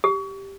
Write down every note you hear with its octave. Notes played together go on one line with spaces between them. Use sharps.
G4